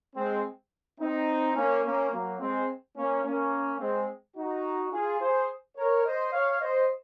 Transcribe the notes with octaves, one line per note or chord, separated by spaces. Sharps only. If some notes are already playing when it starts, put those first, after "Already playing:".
G#3 C4
C4 D#4
A#3 C#4
A#3 C#4
F#3 A#3
G#3 C4
A#3 C#4
A#3 C#4
G#3 C4
D#4 F#4
F4 G#4
G#4 C5
A#4 C#5
C5 D#5
C#5 F5
C5 D#5